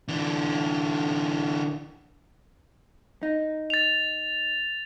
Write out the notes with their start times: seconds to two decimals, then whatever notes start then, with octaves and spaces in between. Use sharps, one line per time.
0.08 D3 E3
3.23 D#4
3.70 A6 F7